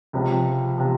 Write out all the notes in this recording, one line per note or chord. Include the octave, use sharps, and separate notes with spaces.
C#2 C3 F3
C3 F3